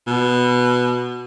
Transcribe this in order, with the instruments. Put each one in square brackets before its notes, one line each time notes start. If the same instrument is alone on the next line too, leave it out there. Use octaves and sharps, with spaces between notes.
[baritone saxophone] B2